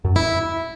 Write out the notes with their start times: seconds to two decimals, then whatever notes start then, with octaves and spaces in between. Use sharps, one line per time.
0.05 F#2
0.16 E4